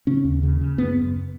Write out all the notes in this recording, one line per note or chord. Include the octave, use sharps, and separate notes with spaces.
C#3 C#4
D#2
C#3
C#3
F#2 B3
F#2